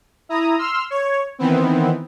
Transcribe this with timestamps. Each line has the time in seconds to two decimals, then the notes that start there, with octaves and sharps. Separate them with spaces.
0.29 E4 A#5 D#6
0.58 C6 E6 F6
0.90 C#5
1.39 D#3 E3 B3 C4